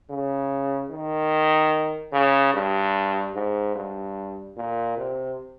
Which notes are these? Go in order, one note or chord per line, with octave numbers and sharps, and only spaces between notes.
C#3
D#3
C#3
G2
G#2
G2
A#2
C3